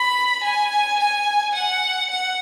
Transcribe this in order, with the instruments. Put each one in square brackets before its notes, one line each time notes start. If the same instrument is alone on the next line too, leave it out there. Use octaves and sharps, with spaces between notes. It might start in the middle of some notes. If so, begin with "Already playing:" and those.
Already playing: [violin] B5
G#5
G#5
F#5
F#5